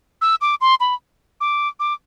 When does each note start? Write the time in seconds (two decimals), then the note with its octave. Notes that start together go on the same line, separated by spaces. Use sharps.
0.21 E6
0.41 D6
0.61 C6
0.80 B5
1.41 D6
1.80 D6